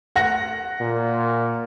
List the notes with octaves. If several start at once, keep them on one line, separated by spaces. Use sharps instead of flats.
F#5 A#6
A#2